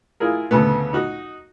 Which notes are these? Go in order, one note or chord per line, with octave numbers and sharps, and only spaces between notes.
E4 F4 G#4 A#4
D2 C#3 A3 B3
D#4 F#4